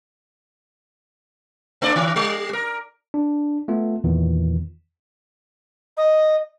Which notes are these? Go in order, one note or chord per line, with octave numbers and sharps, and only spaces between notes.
A3 D4 D5
D#3
G3
A#4
D4
A3 B3 F4
E2 A#2 D#3 E3
D#5